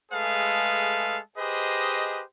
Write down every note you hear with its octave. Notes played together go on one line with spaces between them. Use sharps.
G#3 A3 G#4 A4 B4 F5
G4 G#4 B4 C5 D#5